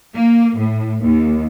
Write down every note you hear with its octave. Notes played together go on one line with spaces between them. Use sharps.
A#3
A2
D#2